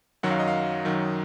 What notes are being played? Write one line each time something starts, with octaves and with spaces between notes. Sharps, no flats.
F#2 D#3 F#3 F#5
F5
D#5
F5
F#2 D#3 F#3